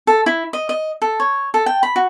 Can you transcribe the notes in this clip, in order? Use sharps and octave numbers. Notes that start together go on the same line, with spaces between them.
A4
E4
D#5
D#5
A4
C#5
A4
G5
B5
F#4